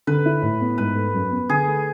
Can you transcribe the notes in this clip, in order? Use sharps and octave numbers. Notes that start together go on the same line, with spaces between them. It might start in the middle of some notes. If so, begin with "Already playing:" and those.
D3 B4
E4
A2
B3
G#2 B4
A3
F#2
B3
D3 G#4
A3